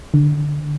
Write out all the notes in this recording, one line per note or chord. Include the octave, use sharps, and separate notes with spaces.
D3